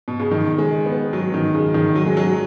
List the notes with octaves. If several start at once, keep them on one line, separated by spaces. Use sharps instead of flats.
B2
C#3
D#3
G#3
B3
F#3
D#3
C#3
D#3
F#3
G#3
F#3